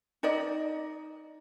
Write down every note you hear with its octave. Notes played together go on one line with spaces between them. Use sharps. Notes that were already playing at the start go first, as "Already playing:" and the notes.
D#4 D5 D#5